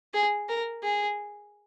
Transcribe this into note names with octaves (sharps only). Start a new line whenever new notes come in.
G#4
A#4
G#4